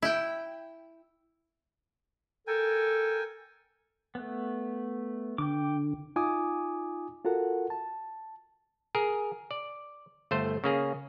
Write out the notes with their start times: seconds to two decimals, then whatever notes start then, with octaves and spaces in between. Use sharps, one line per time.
0.02 E4 G5
2.47 A4 A#4 G5 G#5
4.15 A3 B3
5.38 D3 G5 D6
6.16 D#4 F4 G#5 D6 D#6
7.25 F4 F#4 A4 A#4 F#5
7.70 A5
8.95 G#4 A#4
9.51 D5
10.31 G1 A3 C5
10.64 C#3 A#3 G#4